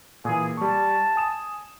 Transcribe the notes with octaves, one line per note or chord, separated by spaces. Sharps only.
A#2 E3 G#4
G3 A5 C#6
G#5 D#6 E7